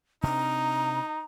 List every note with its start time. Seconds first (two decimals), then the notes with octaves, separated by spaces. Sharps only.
0.23 C3 C4 D4 D#4 A#5